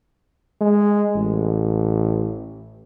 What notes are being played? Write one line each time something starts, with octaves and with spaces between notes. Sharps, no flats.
G#3
A1